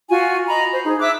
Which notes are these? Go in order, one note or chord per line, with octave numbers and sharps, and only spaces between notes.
F4 F#4 G#5
D#5 A#5 B5
C5
D#4 G#4
E5 D6 E6 F#6